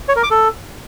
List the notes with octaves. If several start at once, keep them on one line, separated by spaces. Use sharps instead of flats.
C#5
A#4
D6
A4